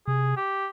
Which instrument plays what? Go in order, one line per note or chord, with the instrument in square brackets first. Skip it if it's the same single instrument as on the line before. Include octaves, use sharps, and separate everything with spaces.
[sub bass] C3 [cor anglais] G#4
[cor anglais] G4